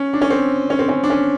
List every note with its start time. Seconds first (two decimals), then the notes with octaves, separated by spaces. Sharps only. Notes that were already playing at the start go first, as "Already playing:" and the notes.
Already playing: C#4
0.13 D4
0.21 C#4
0.30 C4
0.70 C#4
0.79 C4
0.89 C#4
1.03 D4
1.10 C#4